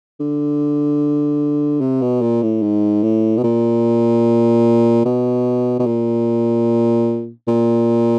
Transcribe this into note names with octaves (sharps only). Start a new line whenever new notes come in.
D3
C3
B2
A#2
A2
G#2
A2
B2
A#2
B2
B2
A#2
A#2